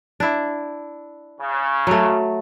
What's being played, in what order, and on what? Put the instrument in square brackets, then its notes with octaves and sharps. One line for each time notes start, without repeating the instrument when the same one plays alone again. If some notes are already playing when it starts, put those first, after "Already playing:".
[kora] D4 E4
[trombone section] C#3
[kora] F#3 A3